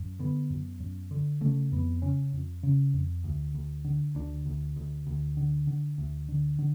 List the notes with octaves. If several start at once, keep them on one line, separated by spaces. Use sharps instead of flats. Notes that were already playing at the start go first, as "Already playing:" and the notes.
Already playing: F#2
D3 B3
F#2
F#2
D3
C#3 A3
F2 B3
C#3 C#4
F2
C#3
F2
D2
D2
D3
D2 D4
D2
D2
D2
D3
D3
D2
D3
D3